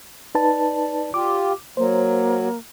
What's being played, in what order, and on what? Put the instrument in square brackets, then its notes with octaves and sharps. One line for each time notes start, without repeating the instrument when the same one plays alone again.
[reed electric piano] D#4 B4 A5 [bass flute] D5
[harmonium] F4 G4 [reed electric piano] D6
[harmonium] F#3 [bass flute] A#3 [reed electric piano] C5